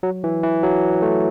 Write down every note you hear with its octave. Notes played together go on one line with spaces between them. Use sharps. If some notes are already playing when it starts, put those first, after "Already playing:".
F#3
E3
E3
F#3
A3